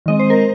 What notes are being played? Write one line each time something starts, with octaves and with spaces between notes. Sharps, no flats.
D#3 G#3 C4 D#5
C5
A#4